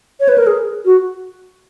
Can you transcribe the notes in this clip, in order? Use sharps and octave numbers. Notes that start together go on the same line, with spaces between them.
C#5
B4
A#4
G#4
F#4